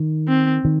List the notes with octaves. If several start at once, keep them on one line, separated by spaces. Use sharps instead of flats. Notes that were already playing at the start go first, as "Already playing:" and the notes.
Already playing: D#3
C4
D#3